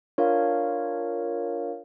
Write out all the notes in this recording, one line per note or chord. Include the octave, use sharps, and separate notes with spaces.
D4 F4 A#4 C#5 F5